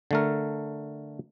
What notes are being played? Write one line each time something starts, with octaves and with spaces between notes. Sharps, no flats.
D3 A3 A#4